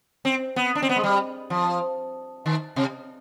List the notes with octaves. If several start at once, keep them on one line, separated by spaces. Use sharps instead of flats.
C4
B3
D4
C4
B3
G#3
G3
F3
D#3
C3